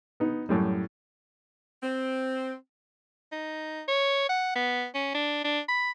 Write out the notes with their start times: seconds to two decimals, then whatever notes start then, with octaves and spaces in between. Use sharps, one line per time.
0.20 B3 D#4
0.49 F#2 A2 G3
1.82 C4
3.33 D#4
3.88 C#5
4.29 F#5
4.56 B3
4.95 C#4
5.15 D4
5.45 D4
5.69 B5